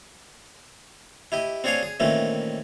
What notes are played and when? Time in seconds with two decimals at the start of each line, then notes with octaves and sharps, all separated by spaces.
1.32 E4 G4 D#5
1.64 C4 D4 G#4 C#5 F5 G#5
1.83 G#4
2.00 A#2 D#3 E3 A3 C4 C#4